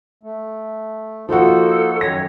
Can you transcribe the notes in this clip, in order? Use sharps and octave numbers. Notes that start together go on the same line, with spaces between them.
A3
F3 A#3 D#4 F#4 A4 C5
F#2 D#3 C#5 A#6